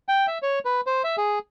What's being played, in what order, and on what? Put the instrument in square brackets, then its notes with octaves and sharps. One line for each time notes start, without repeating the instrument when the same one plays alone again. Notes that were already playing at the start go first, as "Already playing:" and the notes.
[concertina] G5
E5
C#5
B4
C5
E5
G#4